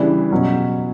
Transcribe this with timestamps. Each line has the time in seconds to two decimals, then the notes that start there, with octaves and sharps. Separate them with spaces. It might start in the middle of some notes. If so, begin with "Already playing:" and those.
Already playing: C#3 E3 G3 D4
0.31 B2 F#3 C#4